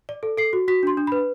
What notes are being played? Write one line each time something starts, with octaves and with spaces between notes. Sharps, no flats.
D5
A4
A4 C7
F#4
F#4 B6
D4 C6
D4
B5
B4